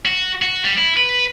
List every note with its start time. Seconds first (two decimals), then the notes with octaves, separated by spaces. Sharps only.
0.06 F#4
0.42 F#4
0.64 G3
0.78 E4
0.97 B4